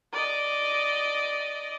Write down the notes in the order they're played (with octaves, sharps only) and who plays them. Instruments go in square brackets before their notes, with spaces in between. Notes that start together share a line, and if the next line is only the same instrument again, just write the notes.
[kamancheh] D5 D#5